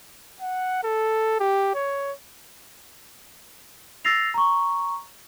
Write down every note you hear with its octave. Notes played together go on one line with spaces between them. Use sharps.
F#5
A4
G4
C#5
E6 A6 A#6 C7 F7
A#5 C#6